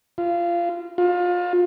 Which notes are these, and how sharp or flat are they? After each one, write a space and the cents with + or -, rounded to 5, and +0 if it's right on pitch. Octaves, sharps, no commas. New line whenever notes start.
F4 -20
F4 +25